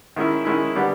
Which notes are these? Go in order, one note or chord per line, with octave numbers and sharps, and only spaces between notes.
D#3 G#3 C#4 E4
D#3 G#3 C#4 E4
D3 G3 B3